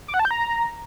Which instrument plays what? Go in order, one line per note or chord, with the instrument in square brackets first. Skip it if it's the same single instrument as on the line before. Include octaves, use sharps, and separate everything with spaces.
[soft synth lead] D6
F#5
A5
G6
A#5